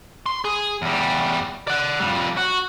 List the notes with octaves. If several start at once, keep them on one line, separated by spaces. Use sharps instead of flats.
C6
G#4
E2 G3
D5 F#5
F2 G3
F#4